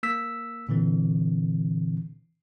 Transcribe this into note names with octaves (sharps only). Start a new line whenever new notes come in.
A#3 E6 B6
A#2 D3 E3 C4